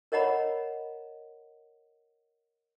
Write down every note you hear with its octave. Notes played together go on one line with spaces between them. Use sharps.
A#4 C#5 D#5 F#5 A#5 B5